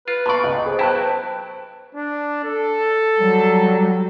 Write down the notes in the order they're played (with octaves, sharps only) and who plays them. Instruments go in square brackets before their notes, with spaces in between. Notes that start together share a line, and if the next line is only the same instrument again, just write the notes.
[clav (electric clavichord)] F4 [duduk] B4
[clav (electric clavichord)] A#2 D5 [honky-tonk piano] A5 B5 C#6
[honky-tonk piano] C#2 [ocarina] D#5
[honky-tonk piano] G#4 [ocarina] C5
[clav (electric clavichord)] F#3 E4 [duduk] B4 [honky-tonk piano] G5 A5 F#6
[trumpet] D4
A4
[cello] F#3 G3